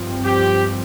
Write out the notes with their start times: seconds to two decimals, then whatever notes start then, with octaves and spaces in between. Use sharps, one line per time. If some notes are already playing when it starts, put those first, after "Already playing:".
Already playing: G2 F3 C4
0.24 G4